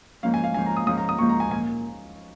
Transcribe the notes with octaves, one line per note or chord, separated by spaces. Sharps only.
G#2 F3 A#3 C#4 F5
G#5
F5
G#2 F3 A#3 C#4 G#5
A#5
D#6
G#2 F3 A#3 C#4 D#6
A#5
D#6
G#2 F3 A#3 C#4 C#6
A#5
G#5
A#2 G#5